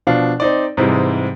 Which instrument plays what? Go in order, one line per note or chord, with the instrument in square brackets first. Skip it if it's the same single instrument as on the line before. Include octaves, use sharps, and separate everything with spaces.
[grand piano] B2 F3 D4 F5
C4 D#4 D5
G#2 C3 E3 G3 G#3